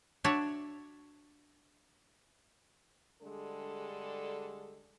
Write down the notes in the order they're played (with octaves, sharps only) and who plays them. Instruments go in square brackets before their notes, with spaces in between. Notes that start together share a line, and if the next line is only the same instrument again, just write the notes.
[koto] D4 F#4 C#5 E5
[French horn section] D3 G3 G#3 D4 G#4 A4